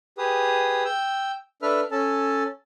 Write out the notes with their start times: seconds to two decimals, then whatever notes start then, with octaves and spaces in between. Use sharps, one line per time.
0.18 G4 G#4 B4 D#6
0.85 G5 E6
1.62 D4 A4 B4 E5 F6
1.91 C#4 A4 A5